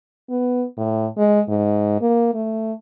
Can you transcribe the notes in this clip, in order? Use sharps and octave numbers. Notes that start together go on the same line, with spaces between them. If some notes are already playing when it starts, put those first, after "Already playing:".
B3
A2
G#3
G#2
A#3
A3